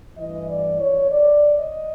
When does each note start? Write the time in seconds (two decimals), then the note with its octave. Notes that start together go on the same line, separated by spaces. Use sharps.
0.17 A1 G2 E3 D#5
0.49 D5
0.80 C#5
1.12 D5
1.59 D#5